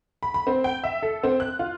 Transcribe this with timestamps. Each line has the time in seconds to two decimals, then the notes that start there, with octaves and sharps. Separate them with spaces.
0.23 B5
0.34 B5
0.47 C4
0.64 G5
0.84 E5
1.03 A4
1.23 C4
1.40 F#6
1.59 F4